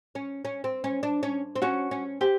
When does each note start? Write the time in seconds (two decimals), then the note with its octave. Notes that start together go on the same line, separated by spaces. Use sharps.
0.15 C#4
0.45 C#4
0.64 C4
0.84 C#4
1.03 D4
1.23 C#4
1.56 C4
1.62 C#4 F#4
1.91 C#4
2.21 C4 G4